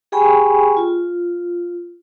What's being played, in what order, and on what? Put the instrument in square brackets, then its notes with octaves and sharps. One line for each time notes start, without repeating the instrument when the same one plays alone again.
[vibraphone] G4 G#4 G5 G#5 B5 C#6
F4